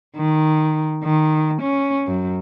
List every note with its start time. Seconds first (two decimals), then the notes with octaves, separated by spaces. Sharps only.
0.15 D#3
1.02 D#3
1.61 C#4
2.07 F#2